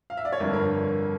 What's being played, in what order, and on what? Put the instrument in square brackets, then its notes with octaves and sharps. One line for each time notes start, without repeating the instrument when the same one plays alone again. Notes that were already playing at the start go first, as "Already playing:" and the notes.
[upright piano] F5
E5
D5
C#5
G1 F2 D3 A#4
A#4